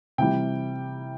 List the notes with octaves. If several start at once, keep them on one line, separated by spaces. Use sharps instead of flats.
C3 E3 G3 G5